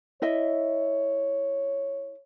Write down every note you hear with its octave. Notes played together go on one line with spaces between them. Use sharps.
E4 C#5 D#5 E5